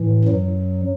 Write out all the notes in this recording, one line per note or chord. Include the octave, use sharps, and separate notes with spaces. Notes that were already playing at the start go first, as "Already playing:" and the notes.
Already playing: A2 E3
F#2 F#3